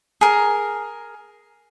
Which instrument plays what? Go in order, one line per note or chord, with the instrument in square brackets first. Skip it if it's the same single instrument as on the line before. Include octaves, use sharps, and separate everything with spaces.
[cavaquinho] G#4 A#4